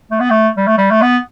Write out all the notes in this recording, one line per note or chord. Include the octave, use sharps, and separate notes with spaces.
A3
B3
A3
G3
A3
G3
A3
B3